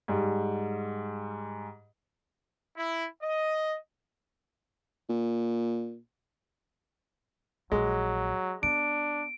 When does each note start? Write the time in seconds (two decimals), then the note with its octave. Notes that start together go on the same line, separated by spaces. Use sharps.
0.08 G#2 G3
2.76 E4
3.22 D#5
5.10 A#2
7.72 A#1 F#3 G#3
8.63 B3 D4 D7